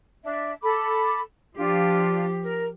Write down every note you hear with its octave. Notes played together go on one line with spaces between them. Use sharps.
D4 E5
A4 B5 D6
F3 D4 F4 G4
A#4